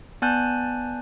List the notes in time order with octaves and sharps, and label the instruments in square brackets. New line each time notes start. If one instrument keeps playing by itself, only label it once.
[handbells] B3 D5 G#5 A5 F#6 G6